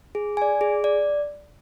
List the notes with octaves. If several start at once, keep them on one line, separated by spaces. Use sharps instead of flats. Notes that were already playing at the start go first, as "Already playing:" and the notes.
G#4
D5 G#5
G#4
D5